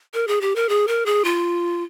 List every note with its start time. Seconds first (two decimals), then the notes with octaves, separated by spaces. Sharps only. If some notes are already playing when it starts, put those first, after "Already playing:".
0.14 A#4
0.27 G#4
0.41 G4
0.55 A#4
0.69 G#4
0.88 A#4
1.06 G#4
1.24 F4